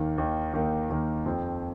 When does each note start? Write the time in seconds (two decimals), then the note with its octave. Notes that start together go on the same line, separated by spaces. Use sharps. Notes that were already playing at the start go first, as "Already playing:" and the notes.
Already playing: D#2 D#3 A#3
0.18 D#2 D#3 A#3
0.53 D#2 D#3 A#3
0.90 D#2 D#3 A#3
1.25 F2 F3 C4